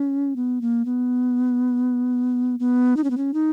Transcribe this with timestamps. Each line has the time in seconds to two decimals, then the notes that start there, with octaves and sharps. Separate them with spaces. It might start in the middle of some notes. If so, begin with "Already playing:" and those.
Already playing: C#4
0.36 B3
0.61 A#3
0.85 B3
2.59 B3
2.97 D#4
3.04 C#4
3.10 B3
3.17 C#4
3.34 D#4